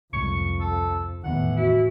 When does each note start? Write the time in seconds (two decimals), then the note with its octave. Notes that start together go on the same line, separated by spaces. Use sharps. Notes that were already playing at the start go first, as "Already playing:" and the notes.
0.13 C2 F2 G#2 C#6
0.61 A4
1.24 E1 A2 D#3 E3 B3 F#5
1.57 E4 F#4